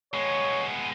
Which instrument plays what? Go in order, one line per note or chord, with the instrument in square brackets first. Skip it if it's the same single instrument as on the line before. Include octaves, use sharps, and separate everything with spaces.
[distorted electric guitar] G#3 B3 [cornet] C#5